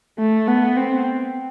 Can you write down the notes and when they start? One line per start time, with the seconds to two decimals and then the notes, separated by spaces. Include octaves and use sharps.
0.19 A3
0.48 B3
0.77 C4